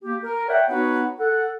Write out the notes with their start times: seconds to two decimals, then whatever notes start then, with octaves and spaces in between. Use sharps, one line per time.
0.03 A#3 G4
0.23 A#4
0.48 C#5 D5 E5 F#5 G5
0.69 B3 D#4 F#4 B4 C#5 F#5
1.18 A4 F#5